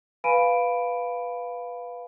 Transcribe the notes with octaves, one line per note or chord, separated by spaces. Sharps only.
B4 F5 G#5 B5 D7 D#7